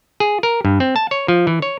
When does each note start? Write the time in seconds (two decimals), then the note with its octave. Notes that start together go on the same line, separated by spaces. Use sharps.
0.20 G#4
0.43 A#4
0.65 G2
0.80 C4
0.96 A5
1.11 C#5
1.28 F3
1.47 E3
1.62 C#5